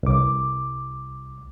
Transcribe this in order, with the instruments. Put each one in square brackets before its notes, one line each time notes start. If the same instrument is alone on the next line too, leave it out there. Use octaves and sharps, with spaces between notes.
[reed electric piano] C2 D6